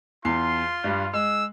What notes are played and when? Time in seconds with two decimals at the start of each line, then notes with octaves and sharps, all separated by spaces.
0.25 E2 F4 C6 C7
0.84 G2 G3
1.13 G#3 E6